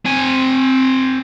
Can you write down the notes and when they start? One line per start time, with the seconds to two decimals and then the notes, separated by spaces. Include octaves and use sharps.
0.05 C4 G#5